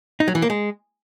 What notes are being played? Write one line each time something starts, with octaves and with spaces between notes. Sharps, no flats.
D#4
F#3
E3
A#3
G#3